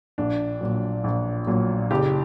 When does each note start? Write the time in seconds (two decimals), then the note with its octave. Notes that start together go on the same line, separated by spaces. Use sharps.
0.18 A#1 D4
0.61 A#2 F#3
1.04 A#1
1.47 A#2 F#3
1.91 F#1 G4